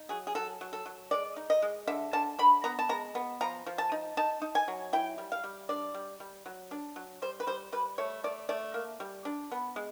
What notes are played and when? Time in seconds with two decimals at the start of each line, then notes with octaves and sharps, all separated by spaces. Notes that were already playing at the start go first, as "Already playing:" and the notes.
Already playing: D#4
0.09 F#3 G#4
0.27 G#4
0.35 F#3 A4
0.61 F#3
0.73 A4
0.86 F#3
1.11 G#3 D5
1.36 D#4
1.50 D#5
1.62 G#3
1.87 D3 E5
2.13 D3 A5
2.39 D3 B5
2.64 B3 A#5
2.79 A5
2.89 G#3 A#5
3.15 B3
3.41 F3 A#5
3.66 F3
3.78 A5
3.92 D#4
4.17 D#4 A5
4.42 D#4
4.55 G#5
4.68 F#3
4.93 E4 G5
5.18 G3
5.32 F5
5.44 G3
5.69 D4 D5
5.94 G3
6.20 G3
6.46 F#3
6.71 D4
6.96 F#3
7.22 G3 C5
7.40 B4
7.47 G3 C5
7.72 G3 B4
7.98 A3 C#5
8.24 A3 D5
8.49 A3 D5
8.74 A#3
9.00 G3
9.25 D4
9.52 B3
9.76 G#3